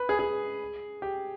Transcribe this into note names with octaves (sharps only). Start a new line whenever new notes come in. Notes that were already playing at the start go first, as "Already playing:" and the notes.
Already playing: B4
G#4
G#4
G4